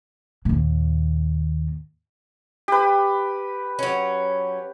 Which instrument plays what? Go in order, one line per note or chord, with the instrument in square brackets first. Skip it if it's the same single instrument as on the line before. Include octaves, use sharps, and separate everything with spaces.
[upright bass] D#2 A#2
[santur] G4 B4
[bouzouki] F#3 C#4